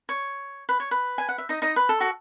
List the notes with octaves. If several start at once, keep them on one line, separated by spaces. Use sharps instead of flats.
C#5
B4
C#5
B4
G#5
F#5
E5
D#4 D#5
D#4 D#5
B4
A4
F#4